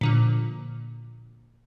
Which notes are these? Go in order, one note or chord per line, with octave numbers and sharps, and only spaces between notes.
A#2 D3 F3